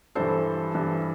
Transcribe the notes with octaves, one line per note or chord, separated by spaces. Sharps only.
G2 E3 A4 C5
G2 E3